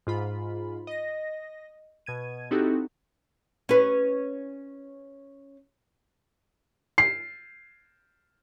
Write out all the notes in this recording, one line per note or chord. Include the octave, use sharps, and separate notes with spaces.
G#2 F4 B5
D#5 A#6
B2 G#6 D#7
C4 D#4 E4 F#4 G4 A4
C#4 B4
C7